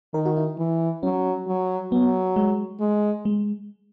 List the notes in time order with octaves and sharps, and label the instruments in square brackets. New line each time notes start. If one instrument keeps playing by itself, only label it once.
[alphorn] D#3 [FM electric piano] A#4
[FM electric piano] F#4
E4
[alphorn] E3
[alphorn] F#3 [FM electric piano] C#4
[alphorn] F#3
[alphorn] F#3 [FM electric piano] B3
[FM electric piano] G#3
[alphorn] G#3
[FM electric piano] G#3